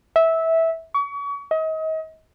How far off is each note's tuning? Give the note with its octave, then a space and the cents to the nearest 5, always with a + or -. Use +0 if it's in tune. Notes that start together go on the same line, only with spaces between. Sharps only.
E5 -15
C#6 +35
D#5 +35